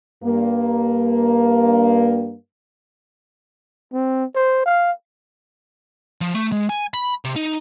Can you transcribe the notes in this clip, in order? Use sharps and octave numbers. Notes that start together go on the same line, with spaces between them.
G2 A#3
C4
C5
F5
F3
A3
G#3
G#5
B5
C3
D#4